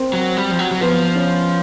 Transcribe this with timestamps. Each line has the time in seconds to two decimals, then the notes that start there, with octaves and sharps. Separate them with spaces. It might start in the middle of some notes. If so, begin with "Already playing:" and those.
Already playing: C4 A#4
0.13 F#3
0.37 G3
0.51 F3
0.59 F#3
0.71 F#3
0.81 F3 B3 B4
1.15 C#4 C#5